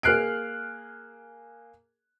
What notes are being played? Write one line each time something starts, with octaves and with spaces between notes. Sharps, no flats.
A#3 G#4 F6 F#6 C7 D7